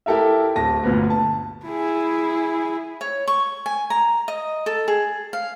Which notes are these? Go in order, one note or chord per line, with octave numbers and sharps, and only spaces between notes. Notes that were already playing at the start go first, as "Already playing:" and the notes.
E4 G4 A4 A#4 E5
D1 A5 A#6
G1 D2 A#2 B3
A5
E4 G#4
C#5
C#6
G#5
A#5
D#5
A4
G#4
F5